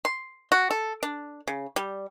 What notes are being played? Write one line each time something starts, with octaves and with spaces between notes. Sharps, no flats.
C6
F#4
A4
D4
C#3
G3